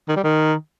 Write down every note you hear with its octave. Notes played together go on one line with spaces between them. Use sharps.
D#3
G3
D#3